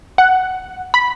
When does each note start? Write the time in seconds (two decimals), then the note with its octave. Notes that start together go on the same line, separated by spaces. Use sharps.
0.18 F#5
0.94 B5